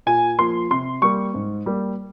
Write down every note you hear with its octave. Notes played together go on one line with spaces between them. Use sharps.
A#2 G#5
F3 A#3 C6
C3 C6
G3 A#3 C#6
G#2
G3 A#3